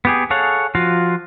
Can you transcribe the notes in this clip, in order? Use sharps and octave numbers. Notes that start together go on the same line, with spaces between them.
B3 G4 G#4
G#4 A4 C#5 F5 F#5
F3 F4 F#4 F5